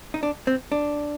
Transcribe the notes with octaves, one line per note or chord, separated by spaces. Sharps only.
D#4
D4
C4
D4